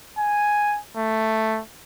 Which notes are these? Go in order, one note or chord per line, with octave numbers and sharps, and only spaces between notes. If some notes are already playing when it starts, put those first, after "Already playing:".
G#5
A3